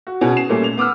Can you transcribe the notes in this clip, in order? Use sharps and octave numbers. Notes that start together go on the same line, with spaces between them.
F#4
B2 C#4 F#4 G#4
C7 E7
A#2 G3 A3 C#4
F7
B3 D6 E6 F6